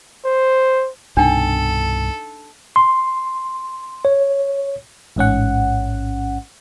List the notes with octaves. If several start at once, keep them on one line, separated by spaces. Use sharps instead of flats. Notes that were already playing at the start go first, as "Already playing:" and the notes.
C5
C2 G2 B2 D4 D#4 A4 G5
C6
C#5
A1 G#2 C#4 F#5